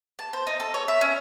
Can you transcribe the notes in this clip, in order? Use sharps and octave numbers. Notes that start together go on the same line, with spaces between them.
A5
C5
D#4
A4
C#5
E5
C#4